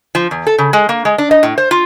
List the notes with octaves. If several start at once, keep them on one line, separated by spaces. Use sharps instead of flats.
F3
E2
A4
C#3
G#3
A#3
G#3
D4
D#5
A2
C5
F4